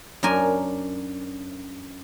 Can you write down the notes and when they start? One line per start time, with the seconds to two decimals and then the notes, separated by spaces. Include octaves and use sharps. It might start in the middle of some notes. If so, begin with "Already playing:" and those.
0.23 F#2 D4 A#4 G#5